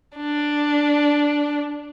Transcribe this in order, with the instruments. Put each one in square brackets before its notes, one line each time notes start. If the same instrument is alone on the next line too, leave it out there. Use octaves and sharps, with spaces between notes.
[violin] D4